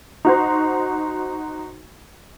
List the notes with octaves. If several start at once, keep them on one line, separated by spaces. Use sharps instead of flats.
D#4 F#4 C5